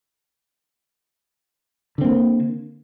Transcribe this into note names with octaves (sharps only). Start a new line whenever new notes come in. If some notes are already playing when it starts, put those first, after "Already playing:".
D3 A#3 C4